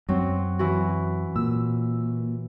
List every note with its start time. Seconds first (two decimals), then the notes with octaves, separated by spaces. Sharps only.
0.09 F#2 F#3 C4
0.59 E3 F#4
1.36 A#2 E6